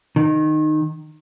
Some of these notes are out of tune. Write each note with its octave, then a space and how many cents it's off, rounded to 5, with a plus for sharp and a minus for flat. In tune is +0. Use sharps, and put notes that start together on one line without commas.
D#3 -15